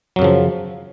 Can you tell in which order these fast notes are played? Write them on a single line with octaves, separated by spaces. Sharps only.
F#3 F#2 C#3 F3